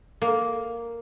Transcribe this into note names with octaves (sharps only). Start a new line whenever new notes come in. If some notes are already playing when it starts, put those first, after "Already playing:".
A#3